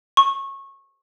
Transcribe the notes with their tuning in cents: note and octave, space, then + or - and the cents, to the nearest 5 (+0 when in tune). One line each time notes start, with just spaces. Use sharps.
C#6 -20